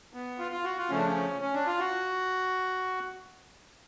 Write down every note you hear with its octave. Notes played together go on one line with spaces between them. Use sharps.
B3
F4
F4
F#4
F4
C#3 F3 A3 C#4
D4
C#4
C#4
D4
F4
F#4